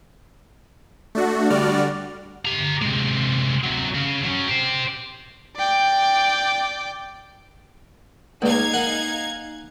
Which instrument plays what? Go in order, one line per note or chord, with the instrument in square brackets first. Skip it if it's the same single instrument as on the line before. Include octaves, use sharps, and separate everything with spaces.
[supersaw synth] A3 D4 F#4
D3 G3 F#4 D5 F6
[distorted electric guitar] G4 A#5
C3 G#3
C3 F#3
C#3
F#3 C#4
G4 C5
[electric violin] D5 G5
[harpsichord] C#2 [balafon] A#3 B4 D5 [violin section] D#4 F5 G#6
[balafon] A#4 [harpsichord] F#5 G#5